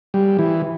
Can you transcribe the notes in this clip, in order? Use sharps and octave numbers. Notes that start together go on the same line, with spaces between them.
G3
E3